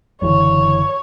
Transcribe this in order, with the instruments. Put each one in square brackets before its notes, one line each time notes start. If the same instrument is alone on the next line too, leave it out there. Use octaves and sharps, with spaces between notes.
[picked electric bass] F#1 D3 E3 [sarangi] C#5